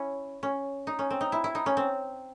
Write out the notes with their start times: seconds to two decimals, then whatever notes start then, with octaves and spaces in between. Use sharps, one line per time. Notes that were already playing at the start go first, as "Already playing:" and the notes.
Already playing: C#4 E4
0.43 C#4
0.87 D#4
0.99 C#4
1.10 C4
1.21 D#4
1.32 E4
1.44 E4
1.55 D#4
1.66 C#4
1.77 C4